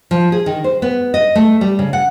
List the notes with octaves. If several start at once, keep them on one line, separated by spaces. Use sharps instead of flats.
F3
G#4
D#3
C5
B3
D#5
A3
G3
C#3
F#5